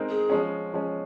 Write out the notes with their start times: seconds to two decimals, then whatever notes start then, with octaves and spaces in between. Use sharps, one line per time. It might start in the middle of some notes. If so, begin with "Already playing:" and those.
Already playing: G#3 C4 D#4 A#4
0.08 G#4
0.30 F3 G#3 C#4
0.74 F3 G#3 C#4